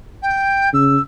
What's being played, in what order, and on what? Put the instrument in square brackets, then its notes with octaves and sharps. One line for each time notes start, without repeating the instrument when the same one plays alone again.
[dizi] G5
[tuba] C#3 [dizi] E6